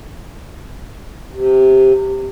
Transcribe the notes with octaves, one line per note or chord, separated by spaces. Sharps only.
C3